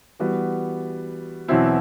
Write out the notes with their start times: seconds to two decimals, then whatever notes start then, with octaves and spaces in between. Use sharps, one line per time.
0.19 E3 G3 B3 F#4
1.48 E2 B2 F#3 C4 E4